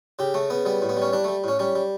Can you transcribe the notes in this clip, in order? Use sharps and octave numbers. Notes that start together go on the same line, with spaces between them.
C#3 G4
C#3 A3
C#3 B3
G3 B3
A2
B3
G3
C#4
G3 D4
G3 A3
A2 C#4
G3 C#4
G3